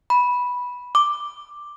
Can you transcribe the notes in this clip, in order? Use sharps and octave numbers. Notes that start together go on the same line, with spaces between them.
B5
D6